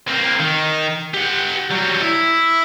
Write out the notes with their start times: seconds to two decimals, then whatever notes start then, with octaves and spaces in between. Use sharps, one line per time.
0.08 A#3 C4
0.40 D#3
1.14 G4 F#5
1.70 F#3 G3
2.01 E4